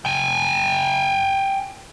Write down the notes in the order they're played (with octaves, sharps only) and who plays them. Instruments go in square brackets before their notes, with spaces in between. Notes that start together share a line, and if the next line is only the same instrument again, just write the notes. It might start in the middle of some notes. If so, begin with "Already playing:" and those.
[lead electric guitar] G5 G#5